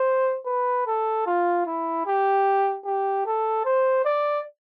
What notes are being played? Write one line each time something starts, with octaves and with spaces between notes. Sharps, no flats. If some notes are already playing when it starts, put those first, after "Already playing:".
Already playing: C5
B4
A4
F4
E4
G4
G4
A4
C5
D5